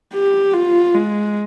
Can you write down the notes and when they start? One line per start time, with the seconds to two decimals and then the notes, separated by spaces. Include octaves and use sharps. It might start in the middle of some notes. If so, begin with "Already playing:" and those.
0.14 G4
0.53 F4
0.95 G#3